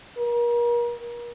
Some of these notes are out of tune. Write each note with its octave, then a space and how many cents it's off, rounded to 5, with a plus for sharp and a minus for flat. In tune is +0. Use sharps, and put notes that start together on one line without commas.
A#4 +35